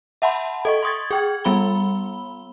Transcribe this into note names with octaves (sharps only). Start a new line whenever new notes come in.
E5 F#5 A5 B5 C6
A4 D#5 C#6
C6 C#6 D#6 G#6 A6
G#4 G5 G#6
G3 B3 B5 G7